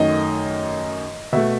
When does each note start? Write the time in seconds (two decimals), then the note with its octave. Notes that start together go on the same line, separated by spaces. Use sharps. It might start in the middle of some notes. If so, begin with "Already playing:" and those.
Already playing: F#2 D#3 A3 D#5
1.33 B2 A3 E5